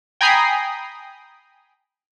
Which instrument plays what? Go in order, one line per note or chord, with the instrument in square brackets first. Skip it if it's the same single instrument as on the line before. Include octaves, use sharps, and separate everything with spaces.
[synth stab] G5 G#5 A#5 B5 D#6 C7